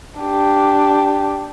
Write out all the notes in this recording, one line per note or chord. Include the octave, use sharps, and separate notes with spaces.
D4 G4